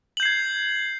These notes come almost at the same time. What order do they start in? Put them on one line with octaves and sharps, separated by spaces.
F#7 G6 C7 G#6